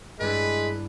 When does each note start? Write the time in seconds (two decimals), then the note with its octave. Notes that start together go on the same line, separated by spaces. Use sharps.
0.20 G2 G#3 D4 E4 B4